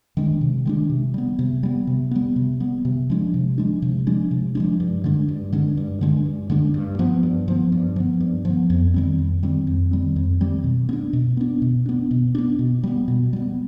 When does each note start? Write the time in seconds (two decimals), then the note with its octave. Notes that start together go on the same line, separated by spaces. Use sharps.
0.17 D#3 G#3 D4
0.41 C3
0.65 D#3 G#3 D4
0.90 C3
1.14 G3 B3
1.39 C3
1.63 G3 B3
1.87 C3
2.11 G3 B3
2.36 C3
2.60 G3 B3
2.85 C3
3.10 F3 G#3 D4
3.34 C3
3.58 F3 G#3 D4
3.82 C3
4.07 F3 G#3 D4
4.31 C3
4.55 F3 G#3 D4
4.80 G2
5.04 D3 G#3 D4
5.28 G2
5.52 D3 G#3 D4
5.77 G2
6.01 D3 G#3 D4
6.26 G2
6.50 D3 G#3 D4
6.74 G2
6.99 F3 B3
7.23 G2
7.48 F3 B3
7.72 G2
7.96 F3 B3
8.20 G2
8.45 F3 B3
8.70 F2
8.94 D#3 G3 C4
9.19 F2
9.43 D#3 G3 C4
9.67 F2
9.91 D#3 G3 C4
10.16 F2
10.40 D#3 G3 C4
10.64 B2
10.89 B3
10.93 D4
11.13 B2
11.37 B3 D4
11.62 B2
11.86 B3 D4
12.11 B2
12.35 B3 D4
12.59 B2
12.83 G3 B3
13.08 B2
13.33 G3 B3